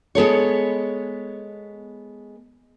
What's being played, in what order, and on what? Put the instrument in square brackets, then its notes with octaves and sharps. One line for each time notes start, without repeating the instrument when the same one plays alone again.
[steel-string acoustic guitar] G#3 B3 A4 C#5